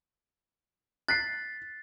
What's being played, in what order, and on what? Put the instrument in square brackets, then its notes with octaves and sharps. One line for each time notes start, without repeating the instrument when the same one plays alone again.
[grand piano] F#6 B6 C7 [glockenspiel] A6